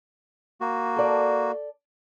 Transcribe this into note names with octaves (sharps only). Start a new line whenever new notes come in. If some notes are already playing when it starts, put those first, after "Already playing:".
A#3 F#4
A4 D5